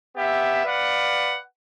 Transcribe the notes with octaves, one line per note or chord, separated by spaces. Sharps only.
B3 G4 E5
B4 D5 F5 F#5